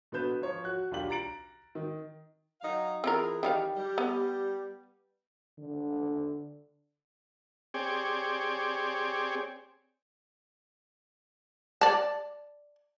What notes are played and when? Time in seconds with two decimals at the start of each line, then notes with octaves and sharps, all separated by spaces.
0.12 B2 D3 B3 B4 G6 E7
0.41 F3 C#5
0.64 F#4 F#6
0.91 B1 D4 F4 G4 F#7
1.10 A#5 A6 D7 F#7
1.75 D#3
2.61 F#3 D#4 F5
3.04 E3 C4 F4 G#4 A#4
3.43 D#3 G3 F5
3.77 G3
3.98 B3
5.58 D3
7.74 C4 G4 G#4 C#5 D5
11.81 D5 A5